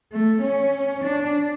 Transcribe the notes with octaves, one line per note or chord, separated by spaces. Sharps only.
A3
C#4
D4